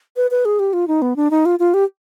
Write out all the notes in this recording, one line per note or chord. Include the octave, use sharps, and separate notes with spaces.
B4
B4
G#4
G4
F4
D#4
B3
D4
D#4
F4
F4
G4